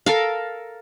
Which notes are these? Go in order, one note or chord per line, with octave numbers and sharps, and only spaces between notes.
A4 A#4 F5